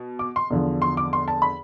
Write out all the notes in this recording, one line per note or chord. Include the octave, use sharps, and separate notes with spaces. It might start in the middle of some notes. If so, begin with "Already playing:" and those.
Already playing: B2
D6
C6
E2 D3 F3
C6
D6
C6
A5
B5